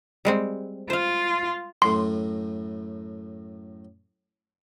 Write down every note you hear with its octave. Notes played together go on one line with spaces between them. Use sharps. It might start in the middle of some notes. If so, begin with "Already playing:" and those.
G3 G#3 C4
F4 C5 F5
F#2 A2 A3 C6